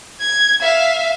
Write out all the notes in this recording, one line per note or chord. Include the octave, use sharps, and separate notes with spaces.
G#6
E5 F5